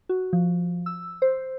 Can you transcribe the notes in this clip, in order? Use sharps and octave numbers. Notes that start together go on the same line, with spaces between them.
F#4
F3
E6
C5